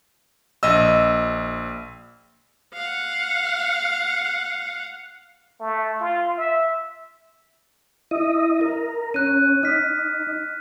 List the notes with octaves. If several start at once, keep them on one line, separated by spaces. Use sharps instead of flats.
A#1 D#5 E6
F5 F#5
A3
F4
E5
E4 D#5
A#4
C#4 F#6 D#7
D#4 F6 B6